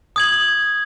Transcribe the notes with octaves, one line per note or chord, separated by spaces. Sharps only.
D#6 G#6 F#7